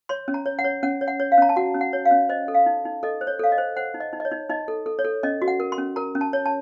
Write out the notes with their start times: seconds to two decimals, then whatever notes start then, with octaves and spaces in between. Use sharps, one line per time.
0.09 C#5 C6
0.28 C#4
0.34 A#5
0.46 C#5
0.59 F#5
0.64 C#5
0.83 C#4 F#5
1.01 C#5
1.08 F#5
1.20 C#5
1.32 F5
1.38 C#4 A#5
1.49 A5
1.56 F#4 F#5
1.74 C#4
1.81 F#5
1.93 C#5
2.05 F5
2.11 C#4
2.29 C5 D#5
2.48 A4
2.55 F5
2.66 D#4
2.85 D#4
3.03 A4 D#5
3.21 C5
3.27 C#5
3.39 A4 F5
3.52 D#5
3.58 C5
3.77 C5 F#5
3.94 D#4
4.00 D#5
4.13 D#4
4.20 D#5
4.25 C#5
4.31 D#4
4.50 D#4 D#5
4.68 A4
4.86 A4
4.99 C#5
5.04 A4
5.23 C#4 D#5
5.42 F#4
5.48 F#5
5.60 A#4
5.72 C6
5.78 C#4
5.96 A#4 A#5
6.15 C#4
6.21 A5
6.33 C#5
6.46 A5